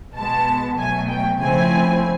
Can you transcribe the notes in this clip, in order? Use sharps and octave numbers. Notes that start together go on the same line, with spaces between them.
B2 G#3 B3 A5
B2 F#3 A3 G#5
G5
C#3 F3 A3 C4 E4 G#5